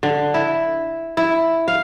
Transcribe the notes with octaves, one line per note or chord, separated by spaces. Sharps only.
D3
E4
E4
F5